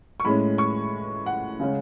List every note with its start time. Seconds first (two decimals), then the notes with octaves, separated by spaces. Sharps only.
0.20 C#6
0.25 A2 G#3 C#4 B5
0.58 C#6
1.26 F#5
1.60 C#3 G#3 C#4